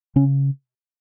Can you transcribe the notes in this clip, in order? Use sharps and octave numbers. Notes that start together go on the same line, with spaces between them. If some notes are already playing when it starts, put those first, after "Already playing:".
C#3 C#4